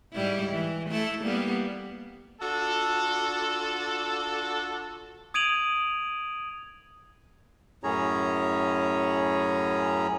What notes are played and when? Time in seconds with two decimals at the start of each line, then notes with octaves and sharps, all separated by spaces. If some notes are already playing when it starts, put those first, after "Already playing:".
0.13 G#2 G3 E4
0.52 E3
0.89 A3 E4 A4
1.23 G3 A#3 B3
2.41 D4 F4 F#4 A4
5.34 D#6 G#6 D7 D#7 F7 F#7
7.84 F#2 A2 C#4 G#4 C#5 A#5